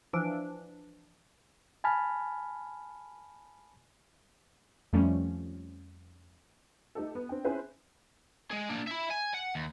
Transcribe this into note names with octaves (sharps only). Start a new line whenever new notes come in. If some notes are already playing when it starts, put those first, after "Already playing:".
E3 F3 D4
G#5 A5 B5 F6
F2 F3 G3 A3 C#4
A3 D#4 G4 A4
B3
C4 D4 G5
C4 C#4 E4 G#4 B4 C5
G#3 G#4
A#3 D4
E5 B5
G#5
F#5
D#2